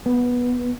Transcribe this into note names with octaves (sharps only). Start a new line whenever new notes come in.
B3